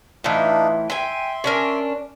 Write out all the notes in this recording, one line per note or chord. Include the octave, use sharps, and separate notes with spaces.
A2 E3 D4 D#4 F4
E5 G5 G#5 C6
C#4 D4 A#4